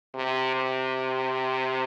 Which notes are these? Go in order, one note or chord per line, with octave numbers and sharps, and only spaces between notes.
C3
C3